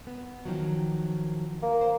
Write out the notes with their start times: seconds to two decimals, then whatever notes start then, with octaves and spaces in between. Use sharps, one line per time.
0.07 B3
0.45 D#3 F3 F#3
1.63 A#3
1.81 C5